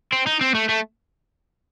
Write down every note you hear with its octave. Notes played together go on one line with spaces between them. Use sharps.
C4
D#4
C4
A3
A3